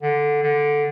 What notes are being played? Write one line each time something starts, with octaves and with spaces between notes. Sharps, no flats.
D3
D3